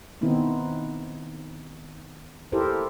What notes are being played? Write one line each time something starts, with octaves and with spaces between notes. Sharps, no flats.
D#3 B3 C4 D#4 E4
E4 G4 A4 A#4 C5